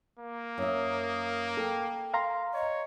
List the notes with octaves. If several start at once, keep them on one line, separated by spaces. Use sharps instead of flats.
A#3
F#2 E5 D#6
A4 G5
F5 A#5 C6
C#5 D#5